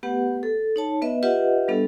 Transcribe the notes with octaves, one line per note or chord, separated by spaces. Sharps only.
A3 B3 G4 B4 F#5
A4
D#4 C#5 A5
B3 B4 D#5 E5
F4 G4 B4 D#5 E5 F#5
G3 B3 D4 A4